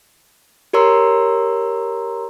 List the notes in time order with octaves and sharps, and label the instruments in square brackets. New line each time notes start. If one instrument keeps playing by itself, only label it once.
[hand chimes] G4 A#4 C#5 A#5 C6 E6